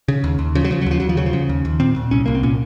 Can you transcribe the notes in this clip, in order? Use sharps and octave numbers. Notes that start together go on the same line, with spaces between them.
C#3
D#2
D#2
C#3 F3
F#3
C#3 F3
F#3
D#2 F3
D#2 F#3
F3
C#3 F#3
F3
C#3
D#2
D#2
A#2 C4
A#2
C2 C#4
C2 A#3
C4
A#2 C#4